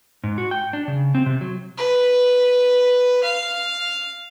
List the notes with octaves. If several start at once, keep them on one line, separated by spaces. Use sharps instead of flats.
G#2
F#4
G5
D4
C#3
C4
C3
F#3
B4
F5